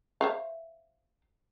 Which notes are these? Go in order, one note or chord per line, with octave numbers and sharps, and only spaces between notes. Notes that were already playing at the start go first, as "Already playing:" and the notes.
C5 E5 F5